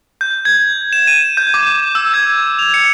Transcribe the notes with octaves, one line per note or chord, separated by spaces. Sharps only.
G6
G#6
E7
D#7
G6
D6
E6
G#6
F7
C#7